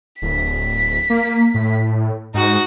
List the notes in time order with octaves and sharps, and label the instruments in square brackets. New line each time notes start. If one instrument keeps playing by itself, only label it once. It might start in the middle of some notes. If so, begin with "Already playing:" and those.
[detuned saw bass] D1 [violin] B6
[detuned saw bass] A#3
A2
[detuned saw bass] G#2 [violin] D#4 F#4